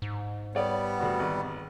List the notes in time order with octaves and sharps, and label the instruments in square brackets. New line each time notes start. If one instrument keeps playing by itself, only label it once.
[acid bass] G#2
[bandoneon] G3 B3 [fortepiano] C#5 D5
[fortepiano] D2 F#4 F#5
G#1